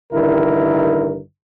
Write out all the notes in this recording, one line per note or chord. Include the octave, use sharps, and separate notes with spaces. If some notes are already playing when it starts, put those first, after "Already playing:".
A1 G2 D3 D#3 E4 A#4